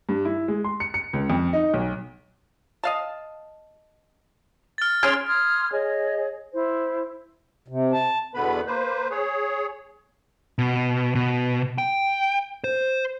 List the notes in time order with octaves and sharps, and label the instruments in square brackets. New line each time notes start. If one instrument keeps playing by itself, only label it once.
[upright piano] G2
E4
G#3
C6
C#7
C#7
C#2
F2
D#4
B1
[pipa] D#5 F5 A5
[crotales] F6 A6
[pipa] C#4 G#4 [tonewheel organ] C6 F6 G#6 [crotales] D7
[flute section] C6 D#6 F6 G#6
G#4 C#5 D#5
E4 C5
[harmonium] C3
A5
[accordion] E2 B2 D3 B3 B4 B5
A#3 B4 C5
G#4 C#5
[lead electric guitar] B2
B2
G5
C5